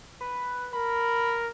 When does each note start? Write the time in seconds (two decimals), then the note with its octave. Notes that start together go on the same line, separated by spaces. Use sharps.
0.21 B4
0.73 A#4 B5